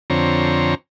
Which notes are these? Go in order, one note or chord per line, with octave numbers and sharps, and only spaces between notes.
F2 D3 C4 C#5 A#5